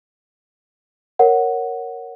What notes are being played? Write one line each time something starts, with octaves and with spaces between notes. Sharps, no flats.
A#4 C#5 F#5